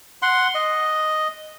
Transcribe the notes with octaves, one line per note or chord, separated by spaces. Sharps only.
F#5 C6
D#5